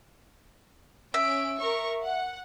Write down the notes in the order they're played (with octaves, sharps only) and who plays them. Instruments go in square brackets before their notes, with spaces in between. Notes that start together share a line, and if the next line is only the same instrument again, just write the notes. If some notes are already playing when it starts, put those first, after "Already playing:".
[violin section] C#4 D7 [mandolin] E5
[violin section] A#4 C#6
F#5